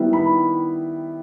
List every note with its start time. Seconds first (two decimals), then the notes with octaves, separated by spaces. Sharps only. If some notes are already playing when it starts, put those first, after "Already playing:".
Already playing: D#3 G3 B3 E4
0.13 B5